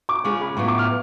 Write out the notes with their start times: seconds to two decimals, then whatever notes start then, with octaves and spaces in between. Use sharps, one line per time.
0.09 D6
0.24 C#3 G#3 C#4 F4 C#6
0.41 B5
0.57 A2 F#3 B3 F4 C#6
0.68 D6
0.79 F6